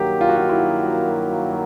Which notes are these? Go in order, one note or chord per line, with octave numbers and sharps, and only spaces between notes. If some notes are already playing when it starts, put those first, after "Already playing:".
Already playing: G2 D#3 F#3 A#3 G4
F4
F#4
F4
E4